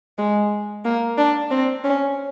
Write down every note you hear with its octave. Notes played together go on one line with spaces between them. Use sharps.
G#3
A#3
D4
C4
C#4